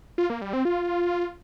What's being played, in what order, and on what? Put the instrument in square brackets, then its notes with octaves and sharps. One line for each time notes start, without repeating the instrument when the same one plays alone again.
[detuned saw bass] F4
A#3
G3
C4
F4